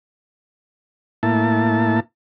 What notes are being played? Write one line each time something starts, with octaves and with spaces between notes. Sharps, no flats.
A2 A#3 E4 A5